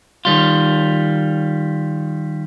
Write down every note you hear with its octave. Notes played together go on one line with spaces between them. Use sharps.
D#3 G3 F4